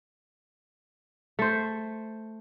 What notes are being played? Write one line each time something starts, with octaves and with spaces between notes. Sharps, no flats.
A3 C5